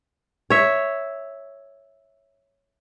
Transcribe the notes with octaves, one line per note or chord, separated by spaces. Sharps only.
C#5 E5